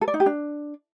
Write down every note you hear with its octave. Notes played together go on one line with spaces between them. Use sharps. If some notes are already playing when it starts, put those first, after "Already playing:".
A4
D5
D#4
G4
D4